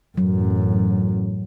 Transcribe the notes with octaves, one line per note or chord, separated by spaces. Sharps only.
A1 F#2 F#3